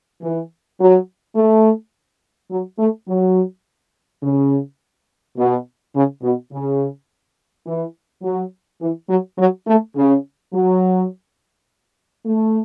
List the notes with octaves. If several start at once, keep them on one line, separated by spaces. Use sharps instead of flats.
E3
F#3
A3
F#3
A3
F#3
C#3
B2
C#3
B2
C#3
E3
F#3
E3
F#3
F#3
A3
C#3
F#3
A3